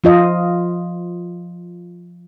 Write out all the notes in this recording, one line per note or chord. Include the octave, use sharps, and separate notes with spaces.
F3 F4 D#5